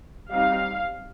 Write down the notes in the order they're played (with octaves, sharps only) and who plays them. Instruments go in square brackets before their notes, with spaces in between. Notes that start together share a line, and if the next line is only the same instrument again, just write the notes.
[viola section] G3 C4 D#4 F5